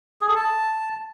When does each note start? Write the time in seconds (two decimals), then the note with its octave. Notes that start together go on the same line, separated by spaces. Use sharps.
0.21 G#4
0.29 A4
0.36 A5